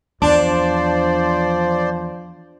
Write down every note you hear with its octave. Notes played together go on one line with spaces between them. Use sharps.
E2 F3 D4 C5 D5